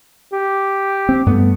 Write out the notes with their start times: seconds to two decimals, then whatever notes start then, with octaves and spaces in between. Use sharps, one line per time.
0.33 G4
1.09 C4
1.26 G2 A3 B3